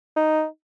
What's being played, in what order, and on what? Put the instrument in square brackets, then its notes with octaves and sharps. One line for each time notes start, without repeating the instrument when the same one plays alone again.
[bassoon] D#4